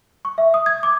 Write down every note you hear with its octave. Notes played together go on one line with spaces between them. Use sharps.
C#6
E5
D#6
G#6
D6